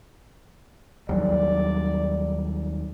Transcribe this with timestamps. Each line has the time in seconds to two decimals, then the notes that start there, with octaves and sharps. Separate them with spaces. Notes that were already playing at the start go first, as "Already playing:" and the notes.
1.09 D#2 F#3 G3 D5